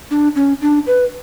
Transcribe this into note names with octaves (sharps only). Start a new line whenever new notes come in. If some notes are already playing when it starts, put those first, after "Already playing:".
D4
C#4
D4
B4